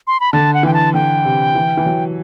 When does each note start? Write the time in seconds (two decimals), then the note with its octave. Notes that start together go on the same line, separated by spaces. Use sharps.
0.07 C6
0.20 B5
0.33 D3 A5
0.54 F#5
0.63 E3 G5
0.74 A5
0.94 D3 G5
1.25 C3
1.55 E3
1.77 E3
1.86 F#3